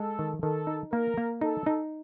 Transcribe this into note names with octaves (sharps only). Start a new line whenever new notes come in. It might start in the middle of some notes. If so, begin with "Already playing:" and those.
Already playing: G#3 A4
D#3
D#3 A4
D#4
A#3 A#4
A#3
D#4 A4
D#4